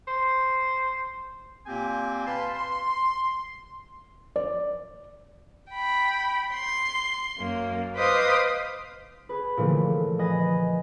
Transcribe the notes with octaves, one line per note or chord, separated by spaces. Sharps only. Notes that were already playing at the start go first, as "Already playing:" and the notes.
C5
A#2 A#3 C4 G4 G5 G#5
B4 F5 A5 B5 C6
C6
D5
G5 B5
C6
F#2 A#3
B4 C5 D#5 F5 D6 D#6
G#4 B4
A#2 D3 E3 F3 A3
B4 D#5 G#5